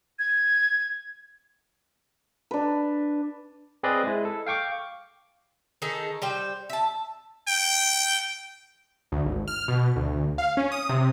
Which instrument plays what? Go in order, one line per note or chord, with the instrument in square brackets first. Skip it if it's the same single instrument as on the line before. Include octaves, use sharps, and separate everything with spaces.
[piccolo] G#6
[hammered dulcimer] D4 B4
[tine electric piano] C4 G#4 B4 D5 D#5
G#3 E4
A4
F5 G5 C#6 D6
[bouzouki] D#3 D#4 G#4 A4
G3 C5 G5
E5 A5
[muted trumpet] G5
[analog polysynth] D2
G#1
F6
B2
D2
F5
C#4
D#6
C3